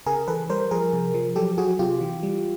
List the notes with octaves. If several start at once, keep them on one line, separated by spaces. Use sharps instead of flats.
C#3 G#4 A#4
E3 A4 B4
G3 A#4 C5
F3 G#4 A#4
C3
F3
F#3 G4 A4
F#3 F#4 G#4
C3 F4 G4
E3
G3